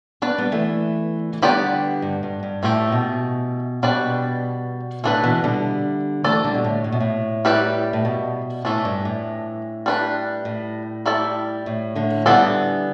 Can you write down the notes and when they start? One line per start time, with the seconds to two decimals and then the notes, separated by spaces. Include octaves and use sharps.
0.22 B3 D4 B4 D5
0.38 G3 B3
0.52 E3 A3
1.33 E3
1.42 D3 G3 B3 G4 B4 D5
2.02 G2
2.23 G2
2.43 G2
2.63 A2 E3 A3 G4
2.92 B2
3.83 B2 G3 D4 B4 D5
5.04 A2 D3 A3 D4 B4
5.24 B2 E3
5.44 D3 G3
6.24 E3 A3 D4 A4 D5
6.44 D3 G3
6.54 B2
6.64 A2
6.84 A2
6.92 B2
7.00 A2
7.45 G3 E4 G4 B4 D5
7.93 A2
8.05 B2
8.65 A2 E3 A3 D4
8.85 G2
9.05 A2
9.86 G3 D4 B4
10.45 A2
11.06 G3 E4 A4 D5
11.66 A2
11.96 A2 D3
12.26 D3 E3 G3 B3 D4 A4 D5